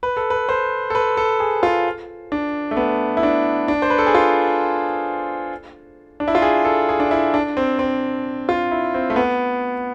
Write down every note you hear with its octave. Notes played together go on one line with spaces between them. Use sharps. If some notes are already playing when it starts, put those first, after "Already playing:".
B4
A4
B4
C5
A4
B4
A4
G#4
F4
D4
A3
B3
E4
D4
D4
C5
B4
A4
G#4
F4
D4
E4
F4
G#4
A4
G#4
D4
E4
D4
C4
C4
F4
E4
C4
A3
B3